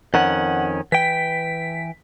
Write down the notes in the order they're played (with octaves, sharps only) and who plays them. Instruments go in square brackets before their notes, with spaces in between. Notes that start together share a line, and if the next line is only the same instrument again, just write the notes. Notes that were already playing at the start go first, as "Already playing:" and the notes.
[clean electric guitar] F2 D#3 C#4 [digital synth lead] F#5
[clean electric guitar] E3 G5 [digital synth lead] B6